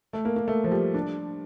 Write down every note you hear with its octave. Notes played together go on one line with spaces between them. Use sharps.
A3
A#3
A#3
A3
F3
G3
D4